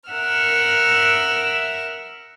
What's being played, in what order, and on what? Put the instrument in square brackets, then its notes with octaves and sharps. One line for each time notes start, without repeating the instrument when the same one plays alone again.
[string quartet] A#4 E5 F#5 E6 F6